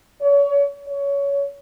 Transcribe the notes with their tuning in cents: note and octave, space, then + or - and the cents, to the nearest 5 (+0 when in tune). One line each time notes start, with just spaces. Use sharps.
C#5 +35
C#5 +20